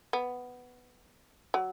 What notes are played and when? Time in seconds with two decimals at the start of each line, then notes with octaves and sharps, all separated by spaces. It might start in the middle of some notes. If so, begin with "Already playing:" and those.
0.13 B3
1.54 F#3